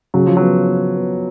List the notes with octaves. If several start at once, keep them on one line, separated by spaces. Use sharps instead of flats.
C#3 F#3
F3
F#3 B3
B3
B3